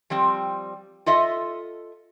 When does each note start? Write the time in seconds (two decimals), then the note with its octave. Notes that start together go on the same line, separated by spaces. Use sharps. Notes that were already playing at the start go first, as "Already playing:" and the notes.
0.10 F3 G3 C4
1.06 F4 A4 D#5 E5